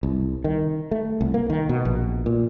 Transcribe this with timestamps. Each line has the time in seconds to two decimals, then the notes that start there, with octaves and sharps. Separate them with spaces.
0.03 C2
0.44 D#3
0.91 A3
1.21 C2
1.34 A#3
1.50 D#3
1.69 B2
1.85 A#1
2.26 A#2